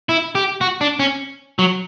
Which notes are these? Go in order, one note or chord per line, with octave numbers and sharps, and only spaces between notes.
E4
G4
F#4
D4
C#4
F#3